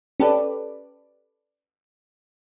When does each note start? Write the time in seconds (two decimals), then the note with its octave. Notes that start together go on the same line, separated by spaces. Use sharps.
0.20 C#4 G4 A4 B4 D5